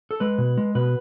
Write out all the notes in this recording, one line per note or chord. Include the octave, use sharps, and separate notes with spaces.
A4
G#3 B4
B2
G#3
B2 B4